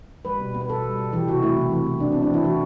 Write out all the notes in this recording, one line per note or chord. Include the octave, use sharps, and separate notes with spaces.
G3 B4
B2
B3
B4
B2 A4
G3
B2
E3 G4
C3 F#4
A3 E4
C3
E3
C3
B3 D4
C4
B3
D4
E3 E4
E3 F#4